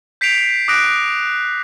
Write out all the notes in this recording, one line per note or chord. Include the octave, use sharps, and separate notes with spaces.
G6 B6 C7 D7 F7
D6 D#6 F#6 A#6 D7